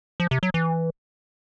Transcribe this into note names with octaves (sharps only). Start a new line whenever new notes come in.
F3
C3
F#3
E3